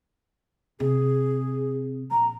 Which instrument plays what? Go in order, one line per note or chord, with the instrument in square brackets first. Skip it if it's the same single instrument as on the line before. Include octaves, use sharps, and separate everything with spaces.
[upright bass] C3 [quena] G#4
[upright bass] A#1 [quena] A#5